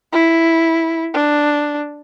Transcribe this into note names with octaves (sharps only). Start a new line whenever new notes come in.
E4
D4